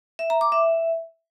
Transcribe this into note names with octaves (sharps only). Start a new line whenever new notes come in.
E5
A#5
D6
E5